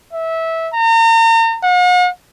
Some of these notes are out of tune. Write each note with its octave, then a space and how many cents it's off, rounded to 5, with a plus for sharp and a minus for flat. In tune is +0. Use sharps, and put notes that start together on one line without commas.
E5 -15
A#5 -40
F#5 -45